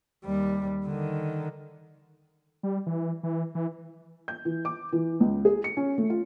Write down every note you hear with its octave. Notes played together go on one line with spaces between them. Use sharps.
D#2 G3
D3 D#3
G3
E3
E3
E3
G6
E3
D6
E3
C#2
G#4
C#7
C#4
A3
F4